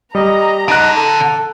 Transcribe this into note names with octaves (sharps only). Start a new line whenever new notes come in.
G3 D#5 A#5
D#4 F#5 A5 F#6 D7
A4